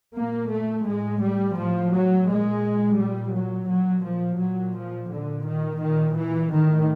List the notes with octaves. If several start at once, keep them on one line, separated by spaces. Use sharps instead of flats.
A#2 A#3
A3
A2 G#3
G3
A2 F3
F#3
A#2 G#3
A#2 G3
F#3
A#2 F#3
F3
A#2 F#3
F3
A#2 D3
D#3
A#2 D#3
E3
A2 D#3